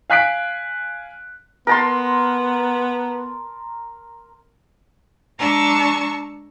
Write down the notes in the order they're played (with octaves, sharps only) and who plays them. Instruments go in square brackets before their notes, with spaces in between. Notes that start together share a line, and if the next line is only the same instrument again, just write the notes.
[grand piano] F5 G#5 F#6 B6 C7 D7
[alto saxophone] B3 [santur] A#4 A5 C6
[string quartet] G#3 D4 A5 A#5 C#6 E6